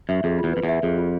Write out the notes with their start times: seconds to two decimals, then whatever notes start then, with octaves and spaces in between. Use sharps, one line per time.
0.09 F#2 E5
0.24 F2 G#4
0.39 F4
0.44 E2
0.53 F2 B4
0.63 E2
0.69 E5
0.83 F2 G#4
0.98 F4